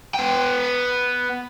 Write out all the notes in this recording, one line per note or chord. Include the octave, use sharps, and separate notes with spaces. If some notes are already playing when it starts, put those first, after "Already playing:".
B3 G5